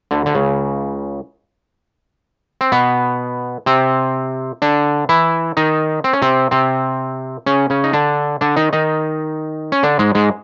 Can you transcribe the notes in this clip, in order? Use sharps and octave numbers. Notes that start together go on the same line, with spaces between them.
D2 D3
D3
C#2 C#3
C4
B2 B3
C3 C4
D3 D4
E3 E4
D#3 D#4
C4
C#4
C3 C4
C3 C4
C#3 C#4
C#3 C#4
D#4
D3 D4
D3 D4
D#3 D#4
D#3 D#4
C#4
D3 D4
G#2 G#3
G#2 G#3